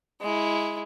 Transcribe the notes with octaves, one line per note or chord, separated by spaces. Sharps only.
G#3 E4